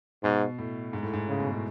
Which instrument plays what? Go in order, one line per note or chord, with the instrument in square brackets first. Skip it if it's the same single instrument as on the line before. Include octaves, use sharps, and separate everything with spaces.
[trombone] G#2 [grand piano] B2
[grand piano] A2
G#2
A2
G#2
[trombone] C#3
[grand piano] B2
A2